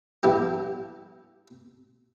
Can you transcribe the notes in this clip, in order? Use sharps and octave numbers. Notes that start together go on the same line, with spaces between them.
A#1 G2 B3 E4 G4